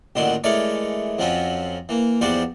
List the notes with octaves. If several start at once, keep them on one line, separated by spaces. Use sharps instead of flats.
A1 A#2 D3 D#3 F#3 C6
E3 G#3 A3 A#4 C#5 D5
F2 F3 F#3 C4 C#4 F4
E3 A#3
E2 F3 G3 F#4 C5 D5